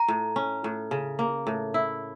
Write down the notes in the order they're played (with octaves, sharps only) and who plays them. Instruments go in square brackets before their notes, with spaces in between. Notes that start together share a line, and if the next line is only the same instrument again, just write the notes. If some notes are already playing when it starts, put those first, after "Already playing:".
Already playing: [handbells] A#5
[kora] A2
C#4
A2
C#3
A#3
A2
E4